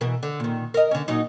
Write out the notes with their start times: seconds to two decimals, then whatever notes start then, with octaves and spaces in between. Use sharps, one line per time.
0.01 B2 E3 A#4
0.23 D3
0.40 A#2 D#3
0.74 A#4 D#5
0.91 D3 C#4
1.08 A#2 F#3 D#4